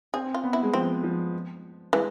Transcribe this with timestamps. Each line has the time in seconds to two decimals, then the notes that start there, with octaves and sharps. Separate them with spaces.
0.14 C4 G#4
0.34 F4
0.44 B3
0.53 E4
0.63 G#3
0.74 F3 C4
1.03 F3
1.93 E3 G#3